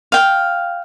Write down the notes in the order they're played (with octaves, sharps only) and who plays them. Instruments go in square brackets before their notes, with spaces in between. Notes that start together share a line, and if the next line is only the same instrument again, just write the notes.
[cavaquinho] F5 G5